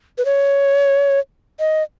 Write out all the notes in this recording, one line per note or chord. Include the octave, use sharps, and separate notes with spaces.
B4
C#5
D#5